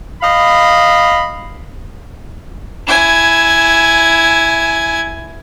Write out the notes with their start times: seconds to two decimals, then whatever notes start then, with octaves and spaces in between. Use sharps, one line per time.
0.22 D#5 F5 B5
2.87 E4 G#5